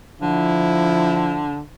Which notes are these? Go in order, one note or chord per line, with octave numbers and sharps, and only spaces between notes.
D3 F3 E4